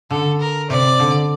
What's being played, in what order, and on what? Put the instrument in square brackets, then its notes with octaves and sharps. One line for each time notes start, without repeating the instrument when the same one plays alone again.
[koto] D3 [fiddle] A4
[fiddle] A#4
[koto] C3 [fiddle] D5
[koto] D3